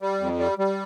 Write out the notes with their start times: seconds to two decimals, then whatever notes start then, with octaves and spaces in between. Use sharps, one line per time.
0.02 G3
0.20 F2
0.39 G3
0.58 G3